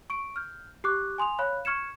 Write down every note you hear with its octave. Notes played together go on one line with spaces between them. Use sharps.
C#6 D7
F6 G6
G4 C#6 D6 F#6
G#5 C6 D#6 F7
C#5 F5 B5 F#6
C#6 F6 G#6 C#7 E7